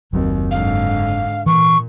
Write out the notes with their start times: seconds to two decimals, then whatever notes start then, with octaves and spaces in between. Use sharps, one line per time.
0.13 F#1 D#2 F#3 C4
0.51 G#2 D3 F5
1.46 A#2 E3 C#6